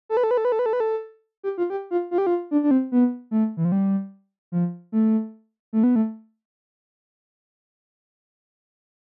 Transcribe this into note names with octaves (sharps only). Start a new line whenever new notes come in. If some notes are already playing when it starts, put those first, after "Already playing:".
A4
B4
A4
B4
A4
B4
A4
B4
A4
B4
A4
G4
F4
G4
F4
F4
G4
F4
D4
D4
C4
B3
A3
E3
F3
G3
F3
A3
A3
B3
A3